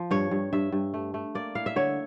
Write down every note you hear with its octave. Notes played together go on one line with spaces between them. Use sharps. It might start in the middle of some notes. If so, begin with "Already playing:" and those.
Already playing: F3
G2 C#5
G2
G2 E5
G2
A3
A3
A#3 D5
E4 F5
E5
D3 C#5